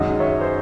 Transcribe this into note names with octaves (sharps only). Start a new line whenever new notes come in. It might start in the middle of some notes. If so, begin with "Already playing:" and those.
Already playing: F#2 D#3 G#3 D#5 F#5
C#5 E5
C5